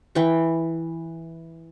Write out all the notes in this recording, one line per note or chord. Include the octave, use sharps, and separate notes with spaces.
E3 G5 C#6